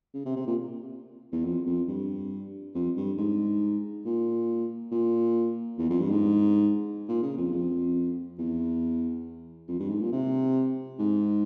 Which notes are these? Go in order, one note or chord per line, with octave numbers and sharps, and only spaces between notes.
C#3
C3
C3
A#2
E2
F2
F2
G2
F2
G2
G#2
A#2
A#2
E2
F2
G2
G#2
A#2
C#3
F2
F2
E2
F2
G2
G#2
A#2
C3
G#2